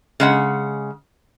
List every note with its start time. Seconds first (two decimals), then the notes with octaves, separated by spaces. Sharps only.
0.20 C#3 G#3 F#5